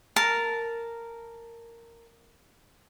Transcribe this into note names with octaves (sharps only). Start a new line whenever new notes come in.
A#4 A5